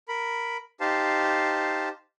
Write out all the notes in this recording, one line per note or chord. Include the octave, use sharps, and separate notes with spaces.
A#4 B5
D#4 G4 C5 F5 A5